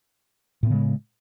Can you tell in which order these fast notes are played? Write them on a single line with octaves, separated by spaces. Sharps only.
A2 B3 C#3 G#3